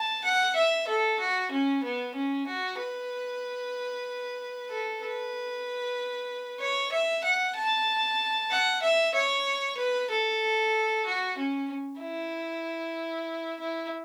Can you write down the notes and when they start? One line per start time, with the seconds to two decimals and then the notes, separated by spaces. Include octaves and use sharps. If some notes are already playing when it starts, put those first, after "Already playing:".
Already playing: A5
0.24 F#5
0.55 E5
0.87 A4
1.19 F#4
1.51 C#4
1.83 B3
2.15 C#4
2.46 F#4
2.78 B4
4.70 A4
5.01 B4
6.59 C#5
6.92 E5
7.24 F#5
7.55 A5
8.50 F#5
8.82 E5
9.14 C#5
9.77 B4
10.10 A4
11.06 F#4
11.37 C#4
12.00 E4
13.59 E4